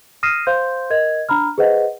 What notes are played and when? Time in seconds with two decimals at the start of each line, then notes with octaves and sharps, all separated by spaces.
0.23 D#6 F6 A#6 C7 D#7 E7
0.47 C5 F5 C6 G6
0.90 A#4 D#5 G#6
1.29 D4 A#5 B5 F6
1.58 G#4 B4 C5 D#5 F#5